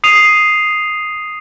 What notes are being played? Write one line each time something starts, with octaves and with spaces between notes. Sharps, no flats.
D#6 C7 D#7 F7